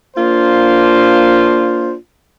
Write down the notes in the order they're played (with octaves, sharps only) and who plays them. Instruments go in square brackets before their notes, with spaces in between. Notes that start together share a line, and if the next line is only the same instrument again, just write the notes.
[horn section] A#3 D4 F4 C5